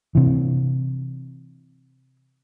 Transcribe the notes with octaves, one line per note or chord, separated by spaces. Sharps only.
C3 E3